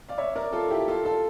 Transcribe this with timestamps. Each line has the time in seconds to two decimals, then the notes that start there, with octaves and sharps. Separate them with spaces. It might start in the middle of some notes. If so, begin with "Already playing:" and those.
0.09 D5 F5
0.18 C#5 E5
0.35 A#4 D5
0.53 F4 A4
0.71 E4 G4
0.88 F4 A4
1.05 F4 A4